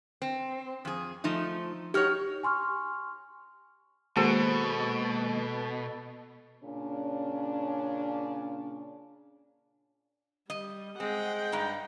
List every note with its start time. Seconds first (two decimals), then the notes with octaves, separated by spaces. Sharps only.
0.22 C4
0.85 F2 G#4
1.24 F3 A3 D#4
1.94 D#4 F#4 G4 C#5 F6
2.43 G#5 C6 C#6 F6
4.16 B2 D#3 G#3 A#3 F#4 G#4 A4 C5
6.64 A#2 C#3 C#4 D4
10.50 G3 D#5
11.00 G#3 C4 F#5 G5
11.52 G2 D#4